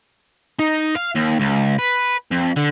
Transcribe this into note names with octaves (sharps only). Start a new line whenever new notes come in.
D#4
F5
D#2
C#2
B4
F2
D3